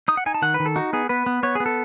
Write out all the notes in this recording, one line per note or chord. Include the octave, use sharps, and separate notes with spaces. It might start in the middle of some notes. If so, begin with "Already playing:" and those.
D#4 D#6
F#5
D#4 G#5
A5
D#3 F#5
B4
D#3
A4
D#4 F#4
B3 G#4
B3 B4
B3
B3 C#5
B3 G#4
A4